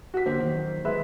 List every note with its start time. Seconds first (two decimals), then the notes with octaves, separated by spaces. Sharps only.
0.14 F#4 B6
0.26 D3 A#3 C5
0.40 B1 E2 D#3
0.85 G#3 B4 E5